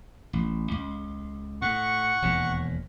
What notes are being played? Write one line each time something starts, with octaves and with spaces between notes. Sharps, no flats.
A1
C#2
A2 F#5 C#6
E1 D#2 A#2